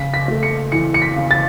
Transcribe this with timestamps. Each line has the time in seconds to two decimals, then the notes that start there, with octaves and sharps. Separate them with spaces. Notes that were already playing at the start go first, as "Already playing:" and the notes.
Already playing: C#3 B6
0.14 B6
0.28 A3
0.43 C#7
0.72 E3 C#7
0.94 C#7
1.02 B6
1.16 C#3
1.31 A6